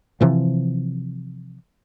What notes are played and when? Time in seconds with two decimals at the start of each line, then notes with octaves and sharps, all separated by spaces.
0.21 C3 E3 F3